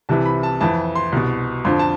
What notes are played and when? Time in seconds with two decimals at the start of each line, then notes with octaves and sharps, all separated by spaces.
0.09 C2 C3 E3 A5
0.26 B5
0.43 A5
0.61 F2 E3 A5
0.95 C6
1.12 C2 B2
1.65 F2 D3 F3 C6
1.79 A5